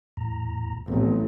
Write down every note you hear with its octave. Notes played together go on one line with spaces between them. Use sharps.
E2 A2 A#5
A1 F3 B3 C4